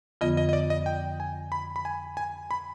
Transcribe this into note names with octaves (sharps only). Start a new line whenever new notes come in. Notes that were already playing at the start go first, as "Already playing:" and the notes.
F2 D3 F3 B3 F4 D#5
D#5
D#5
D5
D#5
G5
G#5
B5
B5
G#5
G#5
B5